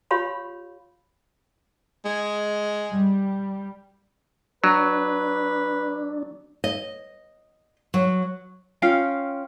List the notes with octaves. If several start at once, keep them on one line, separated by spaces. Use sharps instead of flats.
F4 G4 C#5 F5 B5 C6
G#3
G3
F#3 D4 B4
D#5
F#3
C#4 F4 F5 G5